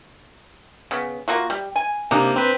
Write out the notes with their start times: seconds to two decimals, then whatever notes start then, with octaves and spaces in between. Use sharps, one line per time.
0.91 C#3 B3
1.28 A#3 F4 F#4
1.50 G3
1.76 G#5
2.11 C3 A#3 D4 D#4 A#5
2.36 C4 B4